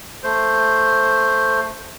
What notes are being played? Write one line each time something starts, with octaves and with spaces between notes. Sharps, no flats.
A3 C5